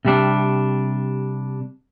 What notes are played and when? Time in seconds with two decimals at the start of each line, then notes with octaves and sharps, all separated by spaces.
0.05 C3 G3 D4